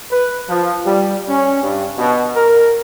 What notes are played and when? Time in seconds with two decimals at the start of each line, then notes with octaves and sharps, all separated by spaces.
0.10 B4
0.48 F3
0.85 G3
1.28 C#4
1.61 G2
1.97 B2
2.35 A#4